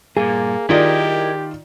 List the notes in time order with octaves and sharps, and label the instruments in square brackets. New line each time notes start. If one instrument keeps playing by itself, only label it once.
[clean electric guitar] G2 A#2 [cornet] A#3 [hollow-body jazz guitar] G#4
[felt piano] D#3 F4 D5 [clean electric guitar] E4 A#4 D#5 [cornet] G4